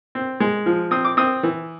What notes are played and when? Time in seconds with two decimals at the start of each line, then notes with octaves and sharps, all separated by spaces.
0.15 C4
0.40 G#3
0.66 F3
0.91 C4 D#6
1.05 D6
1.17 C4 D#6
1.43 E3